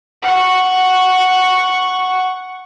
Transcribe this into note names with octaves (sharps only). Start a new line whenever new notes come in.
F#5 C#6